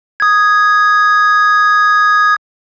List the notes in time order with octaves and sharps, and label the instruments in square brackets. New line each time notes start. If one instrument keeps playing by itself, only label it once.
[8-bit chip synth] D#6 G#6